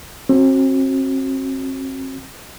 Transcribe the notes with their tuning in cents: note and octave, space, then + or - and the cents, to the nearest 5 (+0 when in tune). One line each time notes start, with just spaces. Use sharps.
C4 +40 F#4 +0